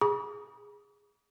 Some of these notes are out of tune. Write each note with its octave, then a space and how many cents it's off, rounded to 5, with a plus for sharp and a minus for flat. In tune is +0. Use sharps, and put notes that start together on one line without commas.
G#4 -10 B5 -40 D6 -45